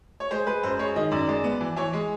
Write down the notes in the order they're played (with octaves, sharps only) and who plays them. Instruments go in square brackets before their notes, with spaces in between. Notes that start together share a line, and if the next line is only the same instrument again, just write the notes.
[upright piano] C#5
G#3 C5
G#3 B4
F#2 C5
G#3 C#5
D#3 D#5
F#2 D5
G#3 D5
B3
E3
E3 C#5
G#3